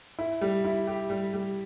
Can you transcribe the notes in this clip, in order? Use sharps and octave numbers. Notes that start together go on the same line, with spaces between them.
E4
G3
E4
G4
G3
G3